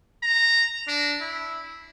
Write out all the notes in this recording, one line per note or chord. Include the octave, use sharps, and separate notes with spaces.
A#5
D4
E4